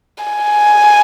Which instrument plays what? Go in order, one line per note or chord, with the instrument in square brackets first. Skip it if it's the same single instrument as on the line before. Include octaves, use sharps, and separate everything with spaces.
[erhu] G#5